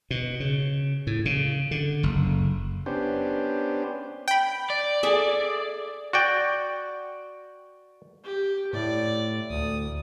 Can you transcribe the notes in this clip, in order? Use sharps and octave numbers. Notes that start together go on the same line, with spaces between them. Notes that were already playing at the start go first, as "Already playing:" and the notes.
B2
C#3
A2
C#3
D3
F#1
B3 C#4 D4 G4 C5
G5 B5
D5
G#4 A4 E5
F#4 D5 G5
G4
A2 D5
D2 D#6